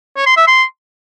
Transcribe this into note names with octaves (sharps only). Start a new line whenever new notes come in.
C#5
C6
E5
C6